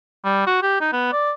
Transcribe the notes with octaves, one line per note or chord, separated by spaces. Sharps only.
G3
F#4
G4
D#4
B3
D5